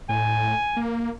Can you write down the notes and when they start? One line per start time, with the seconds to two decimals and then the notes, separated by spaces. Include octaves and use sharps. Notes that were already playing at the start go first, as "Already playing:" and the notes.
0.09 A2 G#5
0.77 A#3